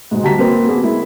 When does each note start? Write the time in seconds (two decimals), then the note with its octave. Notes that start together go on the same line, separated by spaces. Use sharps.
0.11 G#2 B2 G#3
0.23 D2 G3 A5 A#5 B6
0.38 A#3 C4 F#4 A#4 B4
0.68 A#3 B3 G#4
0.84 G#3 E4